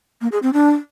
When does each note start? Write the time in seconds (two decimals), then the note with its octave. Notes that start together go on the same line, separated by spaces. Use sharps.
0.21 A#3
0.32 G#4
0.42 C4
0.53 D4